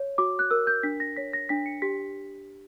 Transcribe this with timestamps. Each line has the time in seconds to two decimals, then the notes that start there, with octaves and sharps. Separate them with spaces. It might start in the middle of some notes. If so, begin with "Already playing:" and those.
Already playing: C#5
0.18 F#4 D6
0.39 F#6
0.51 A#4 E6
0.67 G6
0.83 D4 B6
1.00 A#6
1.16 C#5 B6
1.33 A#6
1.49 D4 B6
1.66 C#7
1.82 G4 B6